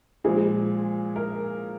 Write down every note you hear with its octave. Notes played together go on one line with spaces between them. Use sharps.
A#2 F3 G#3 G#4
A#4